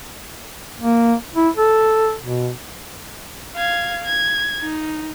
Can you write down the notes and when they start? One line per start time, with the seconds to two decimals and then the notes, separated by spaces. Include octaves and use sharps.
0.80 A#3
1.35 E4
1.57 A4
2.23 B2
3.55 F5 G#6
4.05 G#6
4.61 D#4